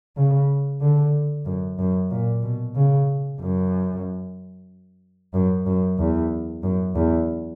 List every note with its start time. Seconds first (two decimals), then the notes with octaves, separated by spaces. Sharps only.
0.17 C#3
0.81 D3
1.46 F#2
1.78 F#2
2.11 A#2
2.43 B2
2.75 C#3
3.40 F#2
5.34 F#2
5.66 F#2
5.98 E2
6.63 F#2
6.95 E2